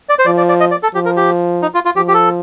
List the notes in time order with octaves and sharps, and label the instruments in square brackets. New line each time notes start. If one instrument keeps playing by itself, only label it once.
[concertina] D5
C5
[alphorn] F3 [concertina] D5
[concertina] D5
D5
D#5
D5
A4
[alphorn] F3 [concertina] G4
[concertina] A#4
G4
D#4
F4
F4
[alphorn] F3 [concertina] G4
[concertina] G4
A4